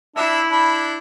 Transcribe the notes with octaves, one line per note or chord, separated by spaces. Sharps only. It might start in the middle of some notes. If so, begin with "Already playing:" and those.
D4 E4 E5
D4 B5